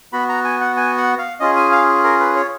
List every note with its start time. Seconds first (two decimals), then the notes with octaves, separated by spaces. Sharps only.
0.13 B3 F#4 B5
0.29 A#5
0.45 G#5
0.61 F#5
0.77 G#5
0.98 F#5
1.19 F5
1.40 C#4 F4 G#4 D#5
1.56 G#5
1.72 F5
2.04 A#4
2.20 B4
2.36 C#5